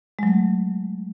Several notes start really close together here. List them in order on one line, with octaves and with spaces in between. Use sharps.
G#3 F#3 A3